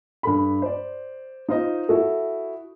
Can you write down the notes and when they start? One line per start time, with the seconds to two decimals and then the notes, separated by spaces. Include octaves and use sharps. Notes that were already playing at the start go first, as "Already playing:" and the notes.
0.23 G2 A4 B5
0.62 C5 D5
1.48 D#4 F4 C5 D#5
1.89 E4 F#4 A4